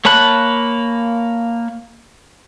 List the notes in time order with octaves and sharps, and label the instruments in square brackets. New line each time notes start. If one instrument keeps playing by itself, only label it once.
[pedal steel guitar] A#3 C#5 A5 B5 F#6